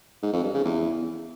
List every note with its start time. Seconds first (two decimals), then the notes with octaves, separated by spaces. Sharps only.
0.23 G#2
0.33 F2
0.43 G2
0.54 C#3
0.64 E2